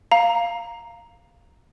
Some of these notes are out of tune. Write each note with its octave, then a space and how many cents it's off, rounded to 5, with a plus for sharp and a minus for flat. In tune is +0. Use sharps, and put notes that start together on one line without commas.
F5 +0 A#5 +0